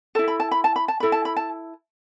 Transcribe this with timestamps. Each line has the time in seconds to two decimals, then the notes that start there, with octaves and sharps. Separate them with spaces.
0.15 E4 A4 A5
0.28 B5
0.40 A5
0.51 B5
0.64 A5
0.76 B5
0.88 A5
1.00 E4 A4 B5
1.12 A5
1.25 B5
1.36 A5